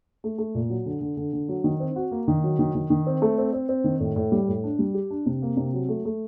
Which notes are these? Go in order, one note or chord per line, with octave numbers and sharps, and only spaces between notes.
A3
A3
A#2
F#3
D3
D3
D3
D3
F#3
D#3
C4
F#4
A#3
D#3
F#3
D#3
D#3
D#3
C4
A3
C4
C4
C4
D#3
A2
A2
G3
A2
D4
G3
G4
D4
C3
A#3
C3
F#3
A3
A3